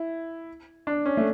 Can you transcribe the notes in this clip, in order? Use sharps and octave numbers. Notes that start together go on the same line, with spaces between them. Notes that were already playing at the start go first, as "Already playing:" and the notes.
Already playing: E4
D4
C#4
A3